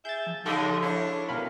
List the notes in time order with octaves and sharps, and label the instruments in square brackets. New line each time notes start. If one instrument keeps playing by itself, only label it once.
[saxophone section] G#4 E5 [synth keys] G6 A6
[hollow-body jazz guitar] F3
[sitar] C#3 G#3 F4 [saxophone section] G3 D#4 [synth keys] A4
[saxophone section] D4 C#5 [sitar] E4 [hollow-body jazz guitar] B5
[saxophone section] F#2 G#3 [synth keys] B2 F5 B5 [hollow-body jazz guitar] A#4 D5 G5